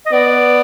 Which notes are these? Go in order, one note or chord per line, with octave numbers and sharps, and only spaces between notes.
D#5
B3 D5